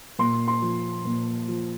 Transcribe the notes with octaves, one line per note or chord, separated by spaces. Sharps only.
A#2 C6
C6
F3
A#2
F3